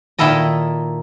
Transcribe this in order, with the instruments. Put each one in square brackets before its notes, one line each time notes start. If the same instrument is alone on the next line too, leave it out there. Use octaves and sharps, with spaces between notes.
[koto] A#2 D#3 A#3 E4 A4 D#5